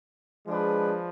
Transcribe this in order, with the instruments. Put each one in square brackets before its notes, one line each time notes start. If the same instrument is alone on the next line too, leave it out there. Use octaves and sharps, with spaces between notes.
[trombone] F3 [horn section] G#3 D4 G#4 B4